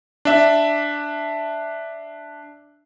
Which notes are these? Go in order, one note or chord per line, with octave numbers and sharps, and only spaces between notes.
D4 E5